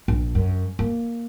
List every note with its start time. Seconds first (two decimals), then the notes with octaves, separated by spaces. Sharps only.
0.08 A#1
0.35 F#2
0.79 A#3